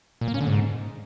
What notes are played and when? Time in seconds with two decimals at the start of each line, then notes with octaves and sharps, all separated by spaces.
0.21 A#2
0.28 A#3
0.34 C#4
0.41 D3
0.47 G#2